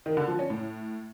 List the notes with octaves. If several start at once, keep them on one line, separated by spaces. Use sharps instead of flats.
D#3
D3
F3
C#4
A2